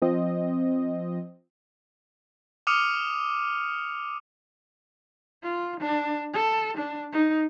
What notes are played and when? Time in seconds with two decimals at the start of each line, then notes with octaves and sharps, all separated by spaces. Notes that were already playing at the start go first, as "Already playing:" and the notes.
0.02 F3 C4 D#5
2.67 D6 D#6 F6 C#7 D#7 F7
5.44 F4
5.80 D4
6.33 A4
6.77 D4
7.12 D#4